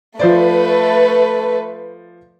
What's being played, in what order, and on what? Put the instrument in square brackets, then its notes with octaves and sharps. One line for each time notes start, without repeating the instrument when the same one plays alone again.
[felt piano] F3 C5 D5 [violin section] A3 B4